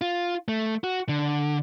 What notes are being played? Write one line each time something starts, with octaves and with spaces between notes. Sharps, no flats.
F4
A3
F#4
D3